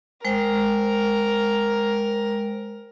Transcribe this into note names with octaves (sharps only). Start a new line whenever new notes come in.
G#3 A#4 C5 G5